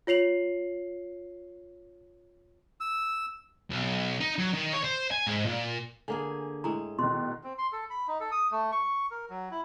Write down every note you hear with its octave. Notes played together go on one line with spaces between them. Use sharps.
F4 C#5 C7 F7 F#7
E6
B1
D#4
F#3
D#3
C#5
C5
G#5
G#2
A#2
D3 A#3 G#4 G#5
A2 G#3 A#5
B2 D#3 C6
C4
C6
A4
B5
D#4
A4
D#6
A3
C#6
A#4
F#3
E4